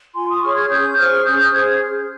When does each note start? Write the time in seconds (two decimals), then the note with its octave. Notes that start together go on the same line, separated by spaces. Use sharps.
0.14 F4 G#5 C6
0.28 C6 D#6
0.42 G#4 C#5 C#6 F6
0.56 F6 G#6
0.69 C#4 D#6 G6
0.97 G#4 C5 C#6 F6
1.25 C#4 D#6 G6
1.39 D#6 G6
1.52 G#4 C5 F6 G#6